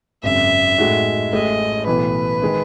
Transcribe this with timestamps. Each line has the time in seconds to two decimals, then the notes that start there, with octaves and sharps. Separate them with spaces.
0.23 G#1 F#2 C#3 E5
0.78 A2 G#3 D#4 F#4
1.33 A1 A2 G#3 D#5
1.87 B1 A2 E3 B3 B4
2.42 D#3 G#3